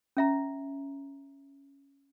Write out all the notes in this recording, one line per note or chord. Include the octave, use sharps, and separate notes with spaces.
C#4 E5 A#5